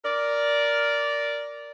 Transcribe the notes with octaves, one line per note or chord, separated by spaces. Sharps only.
A#4 D5